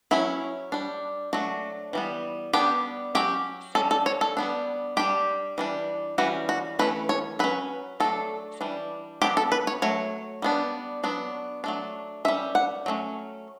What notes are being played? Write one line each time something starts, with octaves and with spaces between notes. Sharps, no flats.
F#3 C#4 E4
G3 D4
F#3 A3 D4 F#4
E3 G3 B3
G3 B3 D4 G4
F#3 C#4 G4
G3 C#4 A4
A4
C#5
A4
G3 B3 D4
G3 D4 G4
E3 G3 D4
E3 G3 C#4 F#4
F#4
E3 A3 C#4 B4
C#5
F#3 C#4 B4
F#3 A3 D4 A4
E3 G3 D4
F#3 B3 D4 G4
A4
B4
C#5
F#3 A3 C#5
G3 B3 D4
F#3 B3 D4
F#3 A3 D4
G3 C#4 E5
F#5
F#3 A3 C#4